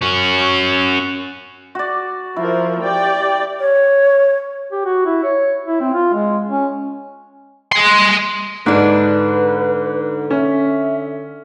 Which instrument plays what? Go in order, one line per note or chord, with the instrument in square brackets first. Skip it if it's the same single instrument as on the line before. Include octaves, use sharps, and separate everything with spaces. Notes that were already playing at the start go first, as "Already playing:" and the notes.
[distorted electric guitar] C#4 F#4
[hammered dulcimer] F#4 D5
[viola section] F3 A#4 [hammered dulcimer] E4
[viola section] G4 D5 G5
[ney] C#5
[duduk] G4
F#4
E4
C#5
E4
C4
F4
G#3
C#4
[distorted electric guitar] D#5 C6
[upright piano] G#2 [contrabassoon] D3 [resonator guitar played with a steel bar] G#3 D4 [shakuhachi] B4
[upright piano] C#4 [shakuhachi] E5